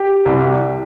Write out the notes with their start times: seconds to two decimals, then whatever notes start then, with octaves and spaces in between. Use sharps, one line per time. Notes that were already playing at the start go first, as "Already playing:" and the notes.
Already playing: G4
0.25 C2 C3 G3